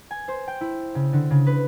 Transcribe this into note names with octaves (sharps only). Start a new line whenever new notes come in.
G#5
C5
G5
E4
C#3
D3
C#3
B4